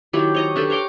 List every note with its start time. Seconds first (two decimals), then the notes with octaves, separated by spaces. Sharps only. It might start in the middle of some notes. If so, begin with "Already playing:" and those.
0.13 D#3 F#3 E4 G4
0.35 C#5 D#5 A#5
0.56 D4 G4 A4 B4
0.70 C#5 A#5 C6 D6